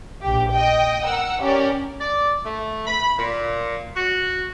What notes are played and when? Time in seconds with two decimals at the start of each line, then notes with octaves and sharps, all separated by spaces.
0.22 A#1 G4
0.54 D#5 G5
1.04 A#4 F#5 E6
1.42 C#4 G4 A#4 D5
2.01 D5
2.45 A3
2.86 B5
3.18 A#2
3.96 F#4